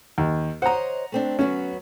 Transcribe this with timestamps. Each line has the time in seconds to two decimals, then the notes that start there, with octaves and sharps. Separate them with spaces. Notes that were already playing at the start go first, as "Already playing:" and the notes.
0.18 D#2
0.62 C5 C#5 D#5 F#5 A#5
1.12 A3 C4 D4
1.39 F#3 B3 C#4 F#4